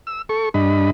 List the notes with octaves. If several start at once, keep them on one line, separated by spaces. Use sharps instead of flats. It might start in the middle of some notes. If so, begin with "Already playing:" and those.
E6
A4 C#6
G2 D4 D#5 B5